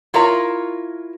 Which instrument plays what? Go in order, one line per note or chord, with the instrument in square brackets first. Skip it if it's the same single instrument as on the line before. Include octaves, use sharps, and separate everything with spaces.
[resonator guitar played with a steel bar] E4 F4 A#4 C#5 A#5